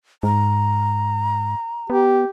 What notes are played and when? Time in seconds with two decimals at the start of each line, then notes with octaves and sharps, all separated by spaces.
0.23 G#2 A#5
1.90 B3 G4